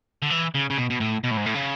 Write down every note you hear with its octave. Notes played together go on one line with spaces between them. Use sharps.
D3
E3
C#3
C#3
B2
B2
A2
B2
A2
G#2
A2
C#3